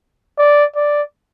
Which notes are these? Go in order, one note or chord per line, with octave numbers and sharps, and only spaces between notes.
D5
D5